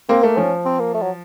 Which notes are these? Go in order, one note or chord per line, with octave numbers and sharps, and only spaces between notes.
A#3 C4
A3 A#3
F3 C#4
C4
A#3
A3
F#3